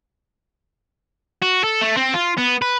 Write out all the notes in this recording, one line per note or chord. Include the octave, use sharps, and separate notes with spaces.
F#4
A4
A3
C4
F4
B3
B4